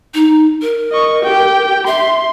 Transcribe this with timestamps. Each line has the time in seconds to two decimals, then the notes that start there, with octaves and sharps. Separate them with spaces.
0.14 D#4
0.62 A#4
0.92 D#5 C#6
1.23 G4 G5
1.87 E5 C6